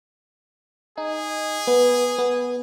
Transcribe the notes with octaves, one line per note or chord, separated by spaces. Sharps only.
D#4 G#4
B3
B3